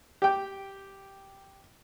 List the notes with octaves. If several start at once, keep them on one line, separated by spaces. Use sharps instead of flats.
G4 G5